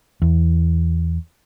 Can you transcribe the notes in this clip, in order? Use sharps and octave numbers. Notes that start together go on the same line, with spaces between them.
E2